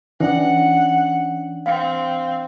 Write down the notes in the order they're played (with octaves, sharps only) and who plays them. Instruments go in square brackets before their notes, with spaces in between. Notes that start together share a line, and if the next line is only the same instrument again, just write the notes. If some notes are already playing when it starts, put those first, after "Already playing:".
[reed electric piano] E3 D4 [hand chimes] C#4 [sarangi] F#5
[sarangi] C4 [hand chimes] F5